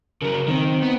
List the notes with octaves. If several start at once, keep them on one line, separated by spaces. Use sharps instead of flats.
C#3 F#3 A#4
D#3 C4
B3